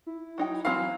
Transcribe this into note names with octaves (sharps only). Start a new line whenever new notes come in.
E4
F#3 D#4 G5
E3 F#3 C4 F5